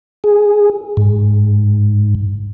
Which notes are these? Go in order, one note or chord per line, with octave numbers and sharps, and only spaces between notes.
G#4
G#2